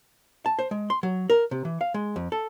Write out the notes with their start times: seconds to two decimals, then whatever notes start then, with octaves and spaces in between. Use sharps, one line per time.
0.46 A5
0.59 C5
0.71 G#3
0.90 C6
1.03 F#3
1.30 A#4
1.51 C3
1.65 E3
1.81 F5
1.94 G#3
2.16 F2
2.32 A4